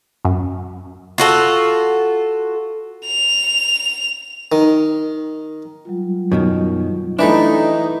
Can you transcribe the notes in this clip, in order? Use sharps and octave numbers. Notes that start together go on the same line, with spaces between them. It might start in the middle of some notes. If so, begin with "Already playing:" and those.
F#2
F4 F#4 A4
F7
D#3
F#3 G3 F4
F#2 B2 D#3
E3 A3 D4 D#4 B4